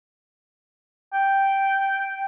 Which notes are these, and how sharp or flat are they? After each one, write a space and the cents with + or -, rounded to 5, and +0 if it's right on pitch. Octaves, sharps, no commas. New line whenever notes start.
G5 -5